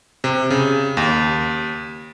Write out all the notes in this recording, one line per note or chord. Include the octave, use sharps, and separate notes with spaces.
C3
C#3
D#2